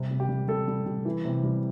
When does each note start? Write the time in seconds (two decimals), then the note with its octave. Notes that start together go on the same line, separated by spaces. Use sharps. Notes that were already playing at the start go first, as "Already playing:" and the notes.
Already playing: C3 G3
0.10 C3
0.20 G4
0.29 G3
0.48 G3 A4
0.68 G3
0.86 G3
1.05 E3
1.25 C3
1.43 G3